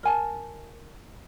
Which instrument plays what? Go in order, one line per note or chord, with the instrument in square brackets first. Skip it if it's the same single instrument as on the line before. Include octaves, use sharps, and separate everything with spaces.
[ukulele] A#4 G#5 A5